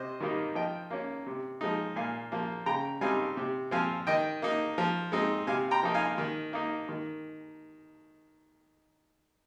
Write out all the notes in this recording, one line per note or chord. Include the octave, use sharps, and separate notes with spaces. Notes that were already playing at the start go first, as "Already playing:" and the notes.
Already playing: C3 C5 D#5
D#3 G3 A#3 D#4
F3 D#5 G5
A#3 C#4
C3
F3 G#3 D#4
A#2 F5 G#5
F3 A#3
C#3 G5 A#5
G3 C4 D#4 F5 G#5
C3
F3 C4 F5 G#5
D#3 D#5 G5
A#3 D#4
F3
G#3 C4 D#4
C3 F5 G#5
G5 A#5
F3 A#3 D#4
F5 G#5
D#3
A#3 D#4
D#3